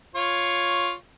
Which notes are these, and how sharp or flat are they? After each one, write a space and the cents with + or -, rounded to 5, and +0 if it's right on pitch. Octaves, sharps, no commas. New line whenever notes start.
F4 +5 C#5 +0